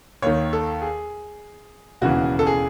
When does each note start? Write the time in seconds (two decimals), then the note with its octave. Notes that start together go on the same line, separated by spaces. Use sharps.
0.22 D#2 D#3 C#5
0.53 A4
0.82 G#4
2.01 E1 D#2 C#3 E3 F#4
2.39 A4
2.47 G#4